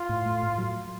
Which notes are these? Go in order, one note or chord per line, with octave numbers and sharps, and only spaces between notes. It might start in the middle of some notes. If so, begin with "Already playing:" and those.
Already playing: F4
A2
A3
A2
F#3